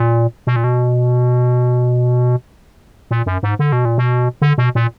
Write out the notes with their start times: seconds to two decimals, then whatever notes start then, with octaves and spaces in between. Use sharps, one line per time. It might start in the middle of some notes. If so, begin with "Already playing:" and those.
Already playing: A#2
0.47 B2
0.56 A#2
0.64 B2
3.11 A#2
3.26 F#2
3.43 G#2
3.59 D3
3.72 B2
3.85 A#2
3.98 B2
4.42 D3
4.58 B2
4.75 A#2